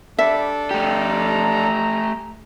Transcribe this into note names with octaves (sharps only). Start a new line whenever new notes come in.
G3 D4 A4 E5
A3 G4 A#5